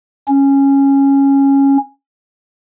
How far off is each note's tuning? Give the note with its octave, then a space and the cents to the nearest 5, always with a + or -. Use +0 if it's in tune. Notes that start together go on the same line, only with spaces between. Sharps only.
C#4 -10